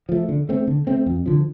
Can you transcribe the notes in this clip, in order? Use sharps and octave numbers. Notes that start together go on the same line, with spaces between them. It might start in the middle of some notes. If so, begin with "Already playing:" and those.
F3 A3
D3
A3 C4
D3
A3 C4
F2
D3 F3